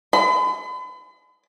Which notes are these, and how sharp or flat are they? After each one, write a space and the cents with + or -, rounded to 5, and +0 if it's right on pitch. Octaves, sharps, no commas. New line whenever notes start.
B5 +40